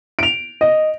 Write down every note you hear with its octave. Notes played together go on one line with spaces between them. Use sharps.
D7 F7
D#5